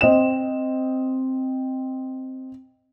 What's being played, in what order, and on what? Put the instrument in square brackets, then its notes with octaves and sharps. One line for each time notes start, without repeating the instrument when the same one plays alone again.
[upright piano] C4 D#5 E7